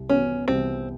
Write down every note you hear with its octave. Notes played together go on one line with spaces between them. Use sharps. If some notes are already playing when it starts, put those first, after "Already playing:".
Already playing: C2
B3 C#4
C2 C4